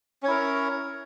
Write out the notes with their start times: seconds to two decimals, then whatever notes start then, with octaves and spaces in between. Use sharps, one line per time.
0.23 C#4
0.25 C#5
0.28 E4
0.30 A#4